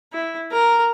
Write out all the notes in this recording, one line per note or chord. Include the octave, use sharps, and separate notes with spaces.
E4
A#4